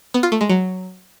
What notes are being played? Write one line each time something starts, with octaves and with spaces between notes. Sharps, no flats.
B3
F4
A3
G#3
F#3